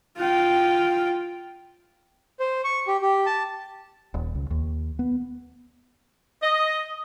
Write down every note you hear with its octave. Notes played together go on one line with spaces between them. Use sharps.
F4 G5
C5
C#6
G4
G4
A5
D#1
C#2
D#2
B3
D#5